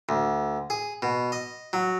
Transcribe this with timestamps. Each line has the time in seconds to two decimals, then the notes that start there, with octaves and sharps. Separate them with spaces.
0.09 D2
0.70 G#4
1.02 B2
1.32 D#5
1.73 F#3